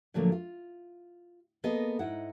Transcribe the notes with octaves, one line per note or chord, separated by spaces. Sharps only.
A2 D3 F3 F#3 A3 A#3
F4
A#3 B3 G#4 A4 D#5
G#2 D#4 E4 F#5